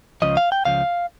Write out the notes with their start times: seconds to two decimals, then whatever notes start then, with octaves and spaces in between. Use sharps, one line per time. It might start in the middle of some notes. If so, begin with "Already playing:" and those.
0.22 C#2 C#3 F3 D#5
0.37 F5
0.52 G5
0.65 C#2 C#3 F3 F5